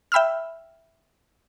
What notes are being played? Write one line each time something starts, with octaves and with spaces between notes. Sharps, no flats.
E5 G5 B5 E6 F6